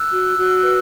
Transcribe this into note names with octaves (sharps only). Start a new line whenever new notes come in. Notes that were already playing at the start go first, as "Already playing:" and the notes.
Already playing: E6 F#6
F#4
F#4
B4